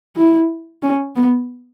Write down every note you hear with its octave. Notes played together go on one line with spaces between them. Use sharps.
E4
C#4
B3